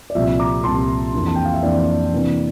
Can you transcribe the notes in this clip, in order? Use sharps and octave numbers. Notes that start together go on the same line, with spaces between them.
D5
C2 A#2 F3 E5
A#5 D6
C2 A#2 F3 A5 C6
F2 E3 A#3 D4
A5
G5
F5
E5
F2 E3 A#3 D4 D5
C3 E3 A#3 D4